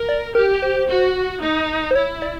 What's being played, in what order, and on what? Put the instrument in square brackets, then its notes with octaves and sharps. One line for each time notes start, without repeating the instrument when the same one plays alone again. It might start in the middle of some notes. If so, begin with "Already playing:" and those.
Already playing: [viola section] A#4
[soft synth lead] D5
[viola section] G4 [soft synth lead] A#4
[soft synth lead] C5
[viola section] F#4
D#4
[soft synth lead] C5
[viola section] E4 [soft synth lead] C#5
[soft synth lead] D5